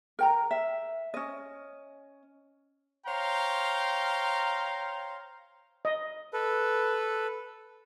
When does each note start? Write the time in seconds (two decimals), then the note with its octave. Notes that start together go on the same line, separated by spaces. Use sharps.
0.19 A#4 G5 A#5
0.51 E5
1.14 C#4 D#5
3.07 C5 C#5 F5 G5 A#5 C6
5.85 D#5
6.33 A4 B4